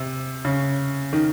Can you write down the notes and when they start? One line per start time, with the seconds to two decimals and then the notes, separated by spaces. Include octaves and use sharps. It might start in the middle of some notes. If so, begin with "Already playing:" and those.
Already playing: C3
0.45 C#3
1.13 D#3